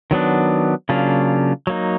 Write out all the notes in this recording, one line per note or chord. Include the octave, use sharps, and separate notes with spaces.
D#3 F#3 B3 D4
C#3 F#3 A#3 D4 F4
F#3 A#3 D#4